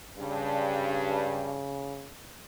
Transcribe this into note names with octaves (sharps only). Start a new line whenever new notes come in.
G2 C#3